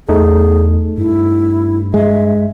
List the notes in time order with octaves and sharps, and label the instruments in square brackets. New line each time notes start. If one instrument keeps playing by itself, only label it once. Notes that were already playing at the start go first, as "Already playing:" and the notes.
[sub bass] E2 [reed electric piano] A3 D#4 A4 [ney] G#4
[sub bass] G2 [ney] E4
[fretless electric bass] G#3 [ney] E5